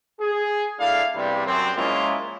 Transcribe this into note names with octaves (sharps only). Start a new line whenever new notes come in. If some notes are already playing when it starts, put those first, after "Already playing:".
G#4
A3 D4 E4 F5
E2 G2 C3 G3
F#2 C4
F3 G#3 A#3 C#4 E4 F4